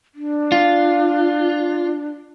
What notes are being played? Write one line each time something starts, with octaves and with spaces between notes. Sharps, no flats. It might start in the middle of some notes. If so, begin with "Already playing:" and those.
D4
F4